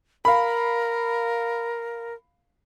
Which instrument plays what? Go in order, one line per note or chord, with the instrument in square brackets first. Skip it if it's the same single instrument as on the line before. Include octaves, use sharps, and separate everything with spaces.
[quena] A#4 [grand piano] F5 B5